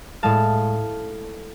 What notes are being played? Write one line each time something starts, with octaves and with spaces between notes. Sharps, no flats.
A2 G#3 F5 A5